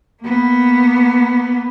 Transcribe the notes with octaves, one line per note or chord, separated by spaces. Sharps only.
A#3 B3